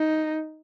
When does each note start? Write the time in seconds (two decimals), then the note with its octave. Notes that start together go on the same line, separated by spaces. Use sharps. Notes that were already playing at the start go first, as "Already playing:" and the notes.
Already playing: D#4